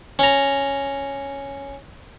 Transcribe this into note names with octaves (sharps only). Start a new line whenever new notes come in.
C#4 A#5